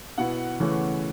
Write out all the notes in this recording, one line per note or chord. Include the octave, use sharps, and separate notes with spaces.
B2 B3 E4 F#5
C#3 E3 A3 C#4 E4